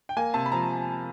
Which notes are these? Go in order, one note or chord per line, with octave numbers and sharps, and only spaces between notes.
G5
A#3 G#5
C3 A5
B5
F3 A#5